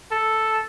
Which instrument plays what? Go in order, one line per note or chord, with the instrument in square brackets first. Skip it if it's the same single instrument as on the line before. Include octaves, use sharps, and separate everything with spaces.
[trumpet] A4